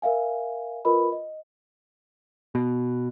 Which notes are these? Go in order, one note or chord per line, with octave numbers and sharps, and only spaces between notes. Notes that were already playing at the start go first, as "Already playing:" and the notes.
A#4 E5 F5 G#5
F4 A#4 B4 D#5 B5
D#5
B2